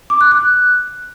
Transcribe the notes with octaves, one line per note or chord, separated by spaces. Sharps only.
D6
F#6
F#6